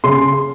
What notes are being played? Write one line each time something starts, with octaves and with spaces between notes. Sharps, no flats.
C#3 C6